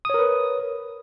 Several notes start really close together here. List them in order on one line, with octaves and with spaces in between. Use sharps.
D#6 C#5 A#4 B4